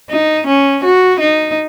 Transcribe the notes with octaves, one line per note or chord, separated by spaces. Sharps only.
D#4
C#4
F#4
D#4